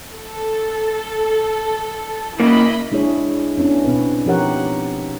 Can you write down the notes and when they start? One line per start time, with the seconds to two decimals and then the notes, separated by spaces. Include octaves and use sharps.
0.15 A4
2.40 C#3 A#3 E4 D#5 B5
2.92 G#3 D4 E4 G#4 C#5 D5
3.58 B3 C#4 D4 E4
3.84 B2 C4 B4
4.26 F3 D#4 G4 A#4 C#5 F#5